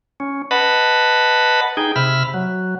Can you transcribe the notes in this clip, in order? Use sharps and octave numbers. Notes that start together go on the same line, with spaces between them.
C#4
B4 D#5 F#5 A5 B5
D#4 G#4 G5
C3 E5 B5 F6
F#3